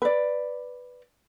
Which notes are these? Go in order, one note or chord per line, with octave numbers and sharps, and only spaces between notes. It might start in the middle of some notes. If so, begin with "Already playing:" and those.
B4 D5